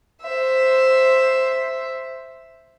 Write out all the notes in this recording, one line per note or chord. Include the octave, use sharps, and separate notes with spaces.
C5 E5